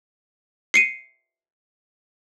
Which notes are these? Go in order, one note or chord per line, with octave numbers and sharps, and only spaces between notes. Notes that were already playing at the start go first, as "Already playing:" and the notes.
C7 C#7 D#7